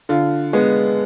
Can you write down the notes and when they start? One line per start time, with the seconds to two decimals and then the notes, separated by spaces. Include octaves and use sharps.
0.09 D3 F4
0.53 G#3 B3